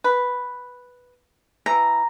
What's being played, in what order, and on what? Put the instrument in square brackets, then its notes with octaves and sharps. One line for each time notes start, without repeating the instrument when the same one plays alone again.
[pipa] B4
[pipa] E3 [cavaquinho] A#5